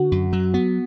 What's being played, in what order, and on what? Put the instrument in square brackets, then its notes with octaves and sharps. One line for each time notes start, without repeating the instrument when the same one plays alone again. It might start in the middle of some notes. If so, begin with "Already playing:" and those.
Already playing: [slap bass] D3 [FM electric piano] F#4
[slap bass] F#2
F#3
[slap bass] B3 [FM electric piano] F#4